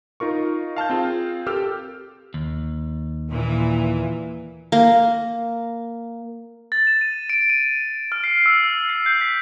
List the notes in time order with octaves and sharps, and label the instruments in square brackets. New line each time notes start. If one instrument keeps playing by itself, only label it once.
[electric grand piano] D#4 F4 A#4 C#6
F5 A5 F6 G6
C4 F4 G#4
G4 A4 A#4 E6 F6 G6
[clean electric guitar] D#2
[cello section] A#2 E3
[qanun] A#3
[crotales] A6
E7
D#7
D7
D#7
F6
C7
E6
F6
C7
G6
B6